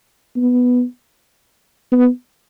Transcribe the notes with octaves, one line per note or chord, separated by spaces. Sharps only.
B3
B3